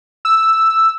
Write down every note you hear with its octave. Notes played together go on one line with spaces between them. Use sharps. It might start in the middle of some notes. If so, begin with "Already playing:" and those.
E6